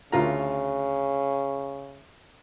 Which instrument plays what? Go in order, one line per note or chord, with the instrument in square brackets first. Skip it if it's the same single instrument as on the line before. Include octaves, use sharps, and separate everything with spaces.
[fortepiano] D2 F4 A#5 [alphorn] C#3